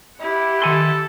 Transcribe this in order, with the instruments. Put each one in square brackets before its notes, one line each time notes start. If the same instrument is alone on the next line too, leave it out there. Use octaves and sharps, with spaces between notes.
[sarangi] E4 [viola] G4 F#5
[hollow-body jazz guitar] D#3 G#5 C6 [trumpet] A4